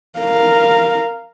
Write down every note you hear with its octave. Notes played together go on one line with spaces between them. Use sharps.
A#4 F5